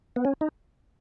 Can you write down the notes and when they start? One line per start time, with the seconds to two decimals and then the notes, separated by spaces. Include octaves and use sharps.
0.16 B3
0.25 C#4
0.41 D#4